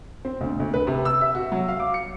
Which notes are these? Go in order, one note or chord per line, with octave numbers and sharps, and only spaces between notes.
C4
D2
D2
B4
C3
E6
E5
F#4
F#3
F5
D6
C#7